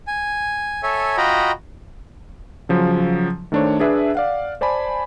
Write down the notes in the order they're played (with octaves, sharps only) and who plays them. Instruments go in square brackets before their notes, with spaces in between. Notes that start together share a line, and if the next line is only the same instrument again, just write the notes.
[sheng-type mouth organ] G#5
A4 C#5 E5 G#5
F4 F#4 D#5 G5 A#5 B5
[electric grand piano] C#3 F3 F#3
D#3 A3 D4 C5 C#5
D4 G#4 B4 E5
D5 F5 F#5
C5 D5 G#5 A5 B5